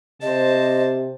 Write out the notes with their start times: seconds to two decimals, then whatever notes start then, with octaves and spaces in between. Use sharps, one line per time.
0.22 C3 C5 D#5 A5